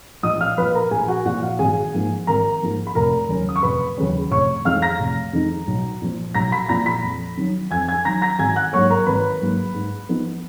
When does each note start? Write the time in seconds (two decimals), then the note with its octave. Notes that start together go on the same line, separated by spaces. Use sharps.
0.23 A#1 D#5 D#6
0.41 F5 F6
0.57 A#2 F3 B4 B5
0.75 A#4 A#5
0.91 A#1 G#4 G#5
1.08 F#4 F#5
1.25 A#2 F3 F#4 F#5
1.43 F5
1.59 G#1 G#4 G#5
1.94 G#2 F3 A#3
2.27 G#1 A#4 A#5
2.62 G#2 F3 A#3
2.87 B5
2.95 F1 A#4 A#5
3.29 D#2 C#3 F#3 C#4
3.49 D#6
3.56 C#6
3.63 F1 B4 B5
3.97 D#2 C#3 F#3 C#4
4.31 F1 C#5 C#6
4.65 F2 D#3 G#3 D#4 F5 F6
4.82 A#5 A#6
5.00 F1
5.33 F2 D#3 G#3 D#4
5.67 B1
6.02 A#2 F3
6.34 B1 A#5 A#6
6.52 B5 B6
6.68 A#2 F3 A#5 A#6
6.86 B5 B6
7.03 F2
7.37 D#3 F#3
7.71 F2 G#5 G#6
7.88 G#5 G#6
8.05 D#3 F#3 A#5 A#6
8.22 A#5 A#6
8.39 G#1 G#5 G#6
8.55 F#5 F#6
8.73 G#2 F#3 A#3 C#5 C#6
8.90 A#4 A#5
9.06 G#1 B4 B5
9.41 G#2 F#3 A#3
9.74 G#2
10.09 F3 B3 D#4